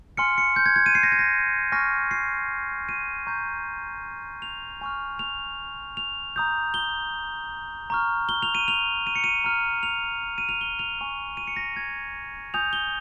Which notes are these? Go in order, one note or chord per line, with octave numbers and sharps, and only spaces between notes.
G#5 C6 F6 C#7
C#7
G6
G#6
G#6
D#7
C7
A#6
G#6
A#6
G#5 C#6 F6 A#6
C7
D#7
A#5 C#6 G6
F7
G#5 C#6 F6
F7
F7
A#5 D#6 G6
G7
A#5 C#6 F6
G7
F7
D#7
F7
D#7
C#7
D#7
A#5 F6
F7
D#7
F7
G7
F7
G#5 C#6 F6
D#7
C#7
A#6
G#6
G#5 D#6 G6 F7
G7